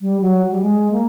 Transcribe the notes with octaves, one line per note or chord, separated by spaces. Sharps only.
G3
F#3
G3
G#3
A#3